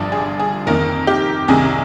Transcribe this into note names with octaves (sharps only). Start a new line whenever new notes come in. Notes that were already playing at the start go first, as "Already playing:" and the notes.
Already playing: G1 G2 D3 F3 D5
G#4
G#4
F2 D#3 A#3 A#4
G4
C2 C3 D#3 G#4